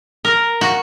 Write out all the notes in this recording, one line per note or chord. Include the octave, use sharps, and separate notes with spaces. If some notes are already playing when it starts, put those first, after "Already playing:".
A#4
F#4